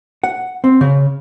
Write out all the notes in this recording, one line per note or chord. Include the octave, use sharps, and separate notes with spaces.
F#5
C4
C#3